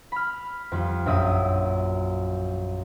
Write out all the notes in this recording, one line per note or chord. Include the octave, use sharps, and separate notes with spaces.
B5 F6
F2 G3 F4
A#1 F#2 E5 D#6